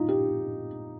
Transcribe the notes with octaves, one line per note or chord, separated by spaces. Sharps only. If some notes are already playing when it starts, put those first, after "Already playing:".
Already playing: D#4 F4
G4